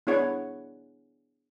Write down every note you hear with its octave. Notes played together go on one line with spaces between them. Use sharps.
B3 D4 E4 G#4 C#5 F#5